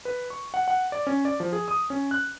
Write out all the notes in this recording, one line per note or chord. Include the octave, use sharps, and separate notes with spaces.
B4
C#6
F#5
F#5
D5
C#4
D5
F3
G#4
D#6
C#4
F#6